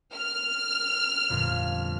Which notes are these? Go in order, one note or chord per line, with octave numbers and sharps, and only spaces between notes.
F6
G1 F2 A#2